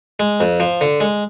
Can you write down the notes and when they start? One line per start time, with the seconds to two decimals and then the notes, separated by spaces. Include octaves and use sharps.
0.20 G#3
0.40 F2
0.60 F3
0.81 D3
1.00 G#3